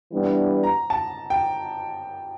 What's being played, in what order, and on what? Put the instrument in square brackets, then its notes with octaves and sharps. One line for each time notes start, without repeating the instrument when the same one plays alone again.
[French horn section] E3 G3 B3 D4
[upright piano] A#5
A5
G5